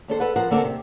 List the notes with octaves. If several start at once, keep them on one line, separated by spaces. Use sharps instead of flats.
D#2 D4 A4 C5
A4 B4 F#5
F3 A#4 C5 F#5
D3 A#3 C4 A4 A#4 D5
C3